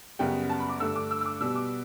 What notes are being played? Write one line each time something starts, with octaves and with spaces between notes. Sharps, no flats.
F#2 C#3 G3 B3 G5
A5
B5
D6
G2 D3 A3 E6
D6
E6
E6
D6
B2 G3 B3 E6
D6